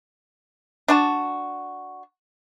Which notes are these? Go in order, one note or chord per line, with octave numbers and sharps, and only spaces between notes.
D4 F#4 A5